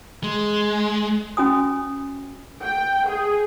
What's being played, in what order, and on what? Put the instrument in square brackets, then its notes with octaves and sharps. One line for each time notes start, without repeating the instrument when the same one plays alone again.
[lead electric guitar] G#3
[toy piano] C#4 F#4 G#5 D#6
[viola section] G5
G#4